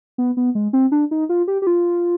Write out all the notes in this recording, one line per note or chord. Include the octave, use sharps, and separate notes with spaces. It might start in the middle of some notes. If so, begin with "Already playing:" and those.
B3
B3
G#3
C4
D4
D#4
F4
G4
G4
F4